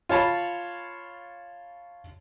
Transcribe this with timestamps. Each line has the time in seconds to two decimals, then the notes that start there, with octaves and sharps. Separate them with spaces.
0.09 F4 C#5 A5 B5